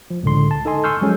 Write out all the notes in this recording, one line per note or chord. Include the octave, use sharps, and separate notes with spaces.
F3
C#2 A2 D3 C6
A5
D#4 A4 D#5 G#5 C6
G#5 C6 C#6 E6 F6 G6
F3 F#3 G#3 C#4 G#4 A4